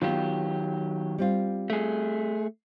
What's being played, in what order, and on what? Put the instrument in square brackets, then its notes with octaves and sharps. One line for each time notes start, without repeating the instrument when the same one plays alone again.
[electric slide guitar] D#3 F#3 G4 [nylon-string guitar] B3 F4
[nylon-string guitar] G3 C4 F4
[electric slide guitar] A3 G#4